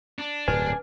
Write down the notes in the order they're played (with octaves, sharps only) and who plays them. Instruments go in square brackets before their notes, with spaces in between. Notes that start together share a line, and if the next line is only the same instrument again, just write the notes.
[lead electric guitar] D4
[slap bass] D1 G2 A#2 [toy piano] B4 [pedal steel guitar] G#5